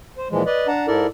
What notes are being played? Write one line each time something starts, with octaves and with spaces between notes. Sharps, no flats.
C5
A#2 E3 F3 G#3
B4 D5 D#5
D4 F#5 A5 A#5
G#2 E4 A4 A#4 D5